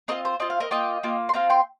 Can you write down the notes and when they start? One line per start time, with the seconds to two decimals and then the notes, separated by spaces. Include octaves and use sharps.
0.08 C4 F4 A#4 D#5
0.25 C5
0.40 C4 F4 D#5
0.50 F5
0.60 A#4 D#5
0.71 A#3 F4 D#5 G5
1.03 A#3 F4
1.29 C6
1.34 C4 F4 F5 A#5
1.50 G5 C6